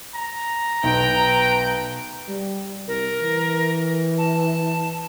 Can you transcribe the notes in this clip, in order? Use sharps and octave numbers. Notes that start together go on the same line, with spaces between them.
A#5
B1 B4 G5
G3
C2 A#4
E3
A5